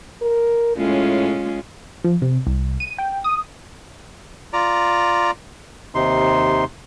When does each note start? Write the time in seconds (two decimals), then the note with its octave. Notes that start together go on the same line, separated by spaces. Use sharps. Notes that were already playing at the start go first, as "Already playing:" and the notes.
0.22 A#4
0.77 A2 G#3 C#4 F4
2.04 F3
2.22 C3
2.47 C2
2.80 D#7
2.98 G5
3.24 D#6
4.53 F4 D5 A#5
5.95 D#2 C3 D#4 C6